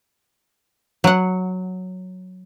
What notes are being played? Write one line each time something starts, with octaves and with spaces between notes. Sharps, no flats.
F#3 F#5